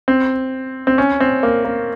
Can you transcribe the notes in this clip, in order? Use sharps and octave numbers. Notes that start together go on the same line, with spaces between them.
C4
C4
C#4
C4
A#3
A#3